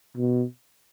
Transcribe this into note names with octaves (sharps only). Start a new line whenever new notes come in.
B2